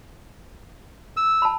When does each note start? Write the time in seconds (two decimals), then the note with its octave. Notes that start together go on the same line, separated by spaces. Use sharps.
1.17 E6
1.42 A5 B5